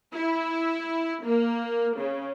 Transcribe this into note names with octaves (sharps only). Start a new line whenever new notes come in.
E4
A#3
C#3